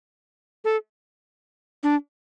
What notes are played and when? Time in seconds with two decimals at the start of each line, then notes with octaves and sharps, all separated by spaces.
0.65 A4
1.83 D4